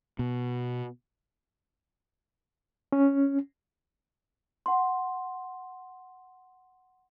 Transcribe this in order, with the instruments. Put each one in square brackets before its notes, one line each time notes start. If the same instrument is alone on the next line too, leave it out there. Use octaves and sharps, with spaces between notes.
[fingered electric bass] B2
[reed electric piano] C#4
[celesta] F#5 C6